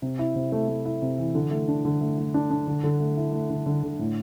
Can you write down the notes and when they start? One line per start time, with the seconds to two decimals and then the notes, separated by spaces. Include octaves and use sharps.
0.02 C3
0.19 E4
0.36 C3
0.52 A3
0.68 A3
0.86 E4
1.02 C3
1.18 E3
1.35 D3
1.51 A3
1.68 D4
1.85 D3
2.01 A3
2.18 A3
2.34 D4
2.51 D4
2.67 D3
2.84 D3
3.00 A3
3.17 E4
3.33 A3
3.50 D3
3.66 D3
3.83 D3
3.99 A2